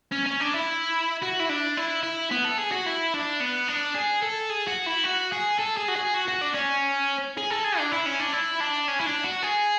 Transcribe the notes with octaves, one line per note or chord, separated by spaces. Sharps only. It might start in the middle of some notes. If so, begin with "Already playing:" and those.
C#4
C#4
D4
E4
F#4
E4
D4
E4
E4
B3
A4
G#4
F#4
E4
D4
B3
D4
G#4
A4
G#4
F#4
E4
F#4
G#4
A4
G#4
F#4
G#4
F#4
F#4
D4
C#4
G#4
A4
G#4
D4
E4
C#4
D4
E4
D4
C#4
E4
D4
F#4
G#4